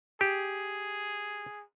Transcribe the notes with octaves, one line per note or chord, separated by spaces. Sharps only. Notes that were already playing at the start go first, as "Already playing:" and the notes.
G4 G#4